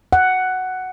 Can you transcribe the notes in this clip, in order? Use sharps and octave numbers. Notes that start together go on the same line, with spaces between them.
F#5